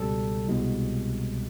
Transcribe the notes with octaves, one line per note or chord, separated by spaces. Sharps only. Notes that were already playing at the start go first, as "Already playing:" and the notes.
Already playing: C#2 B2 G3 A4
C2 B2 G#3